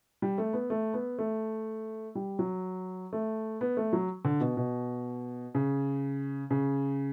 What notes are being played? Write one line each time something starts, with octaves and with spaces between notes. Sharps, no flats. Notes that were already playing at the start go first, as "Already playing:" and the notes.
G3
A3
B3
A3
B3
A3
G3
F#3
A3
B3
A3
F#3
D3
B2
B2
C#3
C#3